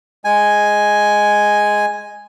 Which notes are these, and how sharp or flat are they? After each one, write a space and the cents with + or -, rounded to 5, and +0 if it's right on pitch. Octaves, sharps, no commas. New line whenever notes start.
G#3 +0 G#5 +0